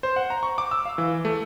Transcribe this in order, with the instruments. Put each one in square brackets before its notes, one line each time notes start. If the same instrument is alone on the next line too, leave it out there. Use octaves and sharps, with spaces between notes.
[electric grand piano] C5
F#5
A#5
C#6
D6
E6
F5
E3
A3